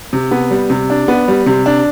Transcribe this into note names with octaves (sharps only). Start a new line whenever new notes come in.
C3
B3
G3
C3
D4
B3
G3
C3
D4